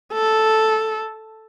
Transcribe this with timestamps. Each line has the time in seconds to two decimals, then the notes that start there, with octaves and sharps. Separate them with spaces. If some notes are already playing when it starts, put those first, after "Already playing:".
0.13 A4